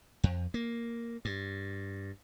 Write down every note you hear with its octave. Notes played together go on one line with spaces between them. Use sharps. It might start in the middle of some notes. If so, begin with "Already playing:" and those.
F2
A#3
G2